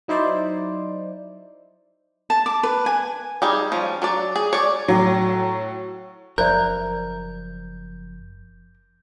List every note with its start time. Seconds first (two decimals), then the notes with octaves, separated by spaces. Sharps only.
0.08 F#3 D#4 E4 C5 D5
2.30 A5
2.46 D6
2.63 B4
2.86 G#5
3.42 G3 D#4 G#4
3.72 F3 C#4
4.02 F#3 D4 D5
4.36 G#4
4.53 C#5 D5
4.88 A2 F#3
6.38 F#1 F3 C#4 A#4 C5 D5 E5 G6